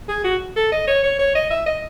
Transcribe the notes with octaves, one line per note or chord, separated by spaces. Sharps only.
G#4
F#4
A4
D#5
C#5
C#5
C#5
D#5
E5
D#5